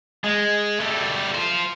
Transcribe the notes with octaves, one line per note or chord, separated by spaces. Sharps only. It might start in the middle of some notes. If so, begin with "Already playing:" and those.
G#3
G3 A3
F4 C5